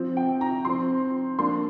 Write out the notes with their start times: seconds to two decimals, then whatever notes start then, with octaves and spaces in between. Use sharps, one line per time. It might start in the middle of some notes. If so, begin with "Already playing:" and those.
Already playing: F3 C4
0.17 G5
0.41 A#5
0.65 F3 C4 C6
1.39 F3 A#3 D4 C6